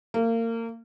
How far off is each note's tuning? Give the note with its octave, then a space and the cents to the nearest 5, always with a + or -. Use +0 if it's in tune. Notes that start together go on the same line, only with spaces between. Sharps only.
A#3 -30